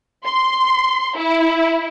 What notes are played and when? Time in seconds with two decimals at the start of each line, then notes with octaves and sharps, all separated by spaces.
0.25 C6
1.17 E4